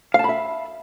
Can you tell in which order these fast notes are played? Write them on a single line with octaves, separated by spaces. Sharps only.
F5 A5 B5 E5